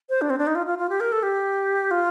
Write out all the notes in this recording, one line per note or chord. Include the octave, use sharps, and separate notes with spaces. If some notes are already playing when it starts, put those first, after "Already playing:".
C5
D4
C4
D4
D#4
F4
F4
F4
G4
A#4
A4
G4
F4